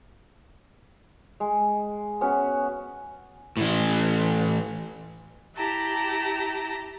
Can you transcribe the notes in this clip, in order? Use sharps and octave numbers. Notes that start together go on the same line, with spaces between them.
G#3
B3 C#4 F#4
A2 E3
E4 G4 A5 A#5